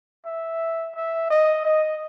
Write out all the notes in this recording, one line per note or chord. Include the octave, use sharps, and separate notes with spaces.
E5
E5
D#5
D#5